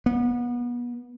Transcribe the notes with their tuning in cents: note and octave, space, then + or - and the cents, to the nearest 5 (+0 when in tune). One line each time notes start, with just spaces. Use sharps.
B3 -30